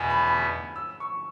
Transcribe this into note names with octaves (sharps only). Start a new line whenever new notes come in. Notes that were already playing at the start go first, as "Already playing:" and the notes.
Already playing: E2 B2 B3 E4 G#5
B5
B5
E6
C#6